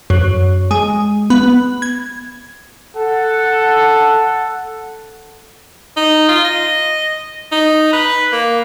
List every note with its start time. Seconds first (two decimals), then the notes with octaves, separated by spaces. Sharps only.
0.10 F#2
0.71 G#3
1.30 B3
1.82 G#6
2.96 A4 F#5
5.97 D#4
6.29 F4
6.45 D#5
7.52 D#4
7.93 B4
8.33 A#3